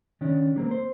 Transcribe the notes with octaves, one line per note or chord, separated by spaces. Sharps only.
D#3 C#4 D4
G3 A#3 C4
C5